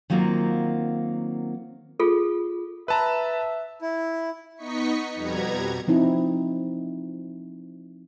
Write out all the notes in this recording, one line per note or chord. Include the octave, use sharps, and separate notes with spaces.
D#3 F#3 A#3 C4 F4
F4 G#4 A4
B4 E5 A5 A#5
E4
B3 D#4 D#5 C#6 B6 C#7
F2 B2 G3 B3 A#5 G#6
F3 C4 D#4 E4